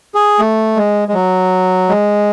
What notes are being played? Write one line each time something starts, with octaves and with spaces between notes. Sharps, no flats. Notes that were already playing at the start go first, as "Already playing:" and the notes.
G#4
A3
G#3
G#3
F#3
G#3